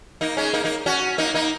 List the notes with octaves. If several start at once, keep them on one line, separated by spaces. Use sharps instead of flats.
A#3 D#4
G#3 C#4
A#3 D#4
A#3 D#4
C#4 F#4
A#3 D#4
A#3 D#4